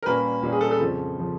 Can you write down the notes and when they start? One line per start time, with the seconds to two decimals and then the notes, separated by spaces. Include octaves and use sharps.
0.03 A#4
0.06 A#2 G3 A#3 C#4 B4
0.43 A#2 G3 A#3 C#4
0.52 G#4
0.61 A4
0.71 A4
0.79 F2 C#3 F3
1.18 C#3 F3